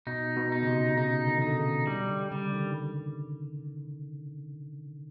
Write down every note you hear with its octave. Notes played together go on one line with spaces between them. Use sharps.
B2 D#4
B2
D#4
C#3
C3
C#3 D#4
D3
D#3 D#4
D3
C#3
G3
D3
C#3 G3
D3
D#3